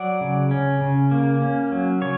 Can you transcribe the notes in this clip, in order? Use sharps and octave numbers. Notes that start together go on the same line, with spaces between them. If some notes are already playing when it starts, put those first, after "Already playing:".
Already playing: F#3 D5 F#5
C#3
C#4
C#3
A#3
C#4
F#3
C#3 C#5